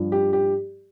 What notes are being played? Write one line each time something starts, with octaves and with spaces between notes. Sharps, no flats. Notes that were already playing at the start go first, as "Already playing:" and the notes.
Already playing: G2 F3
G4
G4